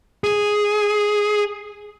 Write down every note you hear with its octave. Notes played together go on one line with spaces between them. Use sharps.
G#4